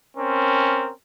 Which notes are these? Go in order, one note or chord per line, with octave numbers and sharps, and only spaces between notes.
C4 C#4 A#4